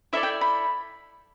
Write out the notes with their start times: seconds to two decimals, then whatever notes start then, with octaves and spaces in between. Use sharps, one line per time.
0.13 E4 A4 D5 E5
0.23 G5
0.41 B5